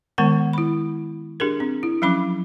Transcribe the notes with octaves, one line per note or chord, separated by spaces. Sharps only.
D#3 G#3 B3 A#4 F#5
E4 B5
D4 G4 G#4 A#4
C4
E4
F3 F#3 C#4 B5 D6